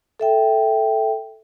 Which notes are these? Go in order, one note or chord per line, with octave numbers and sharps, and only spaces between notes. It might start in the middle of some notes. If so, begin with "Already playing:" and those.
A4 E5 G5